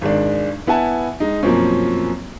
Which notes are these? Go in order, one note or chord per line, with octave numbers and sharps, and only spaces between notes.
G#1 G#3 D4
B3 E4 F#5 G#5 A5
G#3 D#4
F#2 B2 F3 A#3 C4 C#4